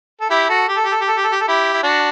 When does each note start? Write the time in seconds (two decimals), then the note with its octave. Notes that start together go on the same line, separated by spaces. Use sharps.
0.21 A4
0.30 E4 G4
0.49 F#4 A4
0.68 G4
0.76 A4
0.85 G4
0.92 A4
1.01 G4
1.08 A4
1.17 G4
1.24 A4
1.32 G4
1.41 A4
1.48 E4 G4
1.73 E4
1.83 D4 F#4